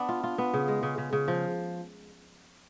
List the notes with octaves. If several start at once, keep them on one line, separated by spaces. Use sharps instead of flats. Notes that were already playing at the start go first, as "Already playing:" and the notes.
Already playing: B3 D4
F4
F4
B3
C#3
G#3
C#3
C#3
C#3
F3